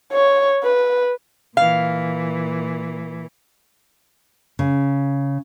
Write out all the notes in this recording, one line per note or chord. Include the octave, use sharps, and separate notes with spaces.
C#5
B4
A#2 E3 F5
C#3